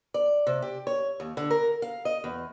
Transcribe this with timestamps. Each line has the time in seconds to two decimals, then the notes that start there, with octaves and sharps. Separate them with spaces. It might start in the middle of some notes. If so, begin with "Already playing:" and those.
0.14 D5
0.47 C3
0.62 G4
0.87 C#5
1.20 D#2
1.37 D3
1.50 A#4
1.82 F5
2.05 D#5
2.24 E2